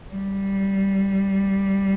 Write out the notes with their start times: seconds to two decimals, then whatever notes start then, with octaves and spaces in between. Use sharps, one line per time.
0.13 G3